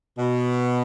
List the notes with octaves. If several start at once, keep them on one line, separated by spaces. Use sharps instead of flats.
B2